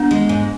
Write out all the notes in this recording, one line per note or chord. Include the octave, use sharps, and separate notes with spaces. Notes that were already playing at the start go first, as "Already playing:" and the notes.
Already playing: B3 D4
G#3
G#2